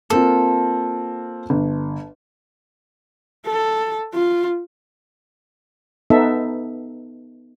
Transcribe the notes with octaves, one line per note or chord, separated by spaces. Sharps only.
A#3 C4 F4 A4
G1
A4
F4
B3 D#4 A4 E5